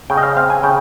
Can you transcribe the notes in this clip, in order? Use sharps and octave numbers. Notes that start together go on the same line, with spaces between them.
C#3 G5
D#5
F5
C4 F5
G#5
C#3 G5